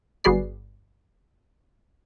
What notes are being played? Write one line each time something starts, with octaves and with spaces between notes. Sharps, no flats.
G1 F#4 G#4 B4 D5 C7